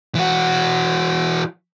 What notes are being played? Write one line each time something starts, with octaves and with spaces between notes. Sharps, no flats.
E3 F#4